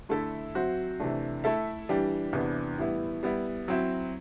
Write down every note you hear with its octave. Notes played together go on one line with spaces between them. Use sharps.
D3 A3 E4 A4 E5
F#3 C4 F#4 C5 E5
C3 E3 A3 D4
A3 E4 A4 E5
E3 G3 D4 G4
E2 C3 E3 B3 D4
A2 E3 G3 B3 E4
G3 B3 E4
F#3 C4 E4